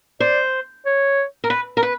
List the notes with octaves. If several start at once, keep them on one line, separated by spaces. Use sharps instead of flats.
C5 D5
C#5
A#4
B4
A#4
B4